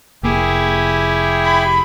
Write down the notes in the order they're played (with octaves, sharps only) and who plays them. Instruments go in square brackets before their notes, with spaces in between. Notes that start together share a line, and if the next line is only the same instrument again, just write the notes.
[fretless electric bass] F1 A#3 [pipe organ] E4 G4 G#4
[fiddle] B5